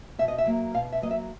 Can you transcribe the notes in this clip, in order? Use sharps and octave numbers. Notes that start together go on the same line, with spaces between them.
B2 E5
D#5
E5
F#3 A#3
B2 F5
E5
F#3 A#3 D#5
E5